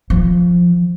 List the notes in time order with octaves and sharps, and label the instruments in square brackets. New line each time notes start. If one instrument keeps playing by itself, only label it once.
[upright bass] F3